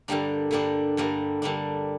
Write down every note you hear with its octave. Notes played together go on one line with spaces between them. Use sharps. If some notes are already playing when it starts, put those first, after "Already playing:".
G2 D3 G3 A#3 D4
G2 D3 G3 A#3 D4
G2 D3 G3 A#3 D4
G2 D3 G3 A#3 D4